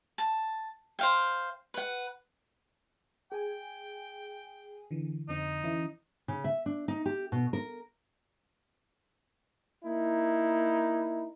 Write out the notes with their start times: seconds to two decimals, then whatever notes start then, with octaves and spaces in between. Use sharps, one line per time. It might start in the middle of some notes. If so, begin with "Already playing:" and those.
0.18 A5
0.99 C5 F5 G5
1.74 B4 F#5
3.32 G#4 G5 G#5
4.91 D3 E3
5.28 F2 D3 C4 D#4
5.64 E3 C#4 E4
6.28 C#3
6.44 E5
6.66 D4
6.88 D#4
7.06 G4
7.32 B2
7.53 A#4
9.84 A#3 D#4 E4